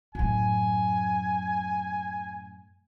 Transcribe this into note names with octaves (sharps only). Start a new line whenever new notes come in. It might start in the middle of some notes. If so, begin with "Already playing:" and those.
F#2 A2 G#5